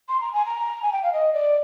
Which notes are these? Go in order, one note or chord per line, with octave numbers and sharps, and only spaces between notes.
C6
A#5
G#5
A#5
G#5
G5
F5
D#5
D5